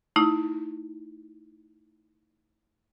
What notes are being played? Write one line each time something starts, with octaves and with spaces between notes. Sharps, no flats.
A3 D#4 E4